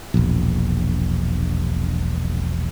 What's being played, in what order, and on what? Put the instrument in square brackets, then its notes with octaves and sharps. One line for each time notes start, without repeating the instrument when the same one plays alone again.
[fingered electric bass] E1 A#1